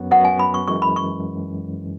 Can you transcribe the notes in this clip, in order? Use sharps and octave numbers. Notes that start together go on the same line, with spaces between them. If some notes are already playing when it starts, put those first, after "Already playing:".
Already playing: F#2 F#3 B3 F#4
F#2 F#3 B3 F#4 F#5
G#5
B5
C#6
F#2 E3 G#3 C#6
B5
C#6